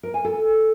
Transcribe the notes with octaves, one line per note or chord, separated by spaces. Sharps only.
A#4
G#5
A4